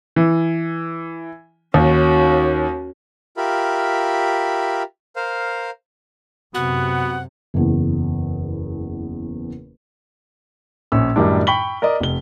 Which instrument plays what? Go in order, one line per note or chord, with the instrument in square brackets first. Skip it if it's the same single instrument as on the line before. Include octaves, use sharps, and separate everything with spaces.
[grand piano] E3
[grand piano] D#2 [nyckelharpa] C#4 F#4
[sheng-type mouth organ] F4 G4 A#4 E5 B5
A#4 C5 F5
[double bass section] F#2 C3 [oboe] B3 [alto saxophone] F#4 [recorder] F#5
[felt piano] F#1 E2
[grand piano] A#1 C#4 E6
F#2 A2 D#3 G3 D4
G5 B5 C#6 B6 F#7 G7
A#4 D5 D#5
F1 G7